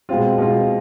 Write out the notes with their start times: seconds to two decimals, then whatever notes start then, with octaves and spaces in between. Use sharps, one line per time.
0.09 B2 G#3 C4 F4
0.38 B2 G#3 C4 F4